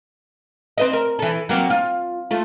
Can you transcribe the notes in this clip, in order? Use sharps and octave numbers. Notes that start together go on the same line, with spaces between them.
C4 B4 D#5
A#4
E3 A4
F#3 A#3 C4
F4
A3 F4